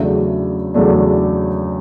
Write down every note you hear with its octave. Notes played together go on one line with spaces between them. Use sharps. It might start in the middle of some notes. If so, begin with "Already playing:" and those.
Already playing: E2 C#3 F#3 A3 D4 E5
E2 C#3 F#3 A3 D4